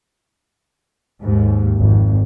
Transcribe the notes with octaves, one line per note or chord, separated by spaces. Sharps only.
D#2 G#2
G#1 F2